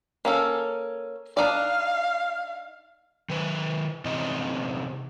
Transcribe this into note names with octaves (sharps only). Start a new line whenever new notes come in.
A#3 C#4 A4
D4 D#4 D5 F5
D#3 B4
C3 E3 C4 D#4 D#5